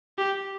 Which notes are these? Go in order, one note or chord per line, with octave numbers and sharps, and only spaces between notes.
G4